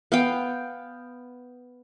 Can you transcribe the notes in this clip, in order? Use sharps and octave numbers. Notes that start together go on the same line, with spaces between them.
B3 F5 G5